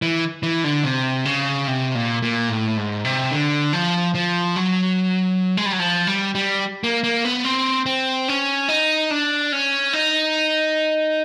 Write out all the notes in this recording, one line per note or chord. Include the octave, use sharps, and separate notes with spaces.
E3
E3
D3
C3
C#3
C3
A#2
A#2
A2
G#2
C3
D3
F3
F3
F#3
G#3
G3
F#3
F3
G3
G3
A#3
A#3
B3
C4
C4
C#4
D#4
D4
C#4
D#4